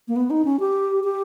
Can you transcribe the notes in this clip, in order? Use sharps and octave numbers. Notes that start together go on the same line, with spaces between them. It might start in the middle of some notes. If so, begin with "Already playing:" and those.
A#3
B3
D#4
C#4
G4
G4